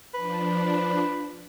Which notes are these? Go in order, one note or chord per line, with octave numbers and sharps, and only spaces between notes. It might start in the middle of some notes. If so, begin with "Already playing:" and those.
F3 D4 B4